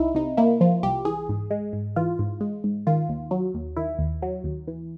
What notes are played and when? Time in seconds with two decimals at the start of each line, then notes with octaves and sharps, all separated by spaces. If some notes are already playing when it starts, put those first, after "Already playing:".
Already playing: C2 D#4 E4
0.15 C3 D#4
0.37 A#3 E4
0.61 F3 F4
0.83 C2 G4
1.05 E3 G#4
1.29 G#2
1.51 G#3
1.73 G#2
1.96 E3 F4
2.19 G#2
2.41 G#3
2.64 G#2
2.87 D#3 F4
3.09 D#2
3.31 F#3
3.55 D#2
3.77 D#3 E4
3.99 D#2
4.22 F#3
4.44 D#2
4.68 E3